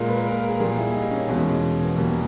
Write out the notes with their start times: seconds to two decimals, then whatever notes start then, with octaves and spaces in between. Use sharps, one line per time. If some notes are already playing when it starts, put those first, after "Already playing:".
Already playing: A#2 G#3 A#4
0.09 B4
0.26 A#4
0.37 A#4
0.49 G#4
0.54 A#4
0.60 A#2 G3 G#4
0.77 E4
0.93 D#4
1.11 C#4
1.27 E2 B2 G#3
1.84 B3
1.96 E2 B2 G3 A#3